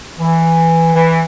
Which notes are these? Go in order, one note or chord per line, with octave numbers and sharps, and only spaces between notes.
E3
E3